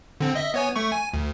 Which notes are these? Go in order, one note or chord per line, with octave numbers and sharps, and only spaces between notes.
D3 C4
D#5 E5
B3 C#5 G#5
A3 C#6
G#5
D2